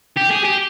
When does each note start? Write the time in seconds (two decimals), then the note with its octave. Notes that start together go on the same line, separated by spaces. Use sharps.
0.17 G4
0.31 G#4
0.44 G4